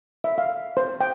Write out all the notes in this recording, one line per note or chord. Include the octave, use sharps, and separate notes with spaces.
E5
F5
C5
G5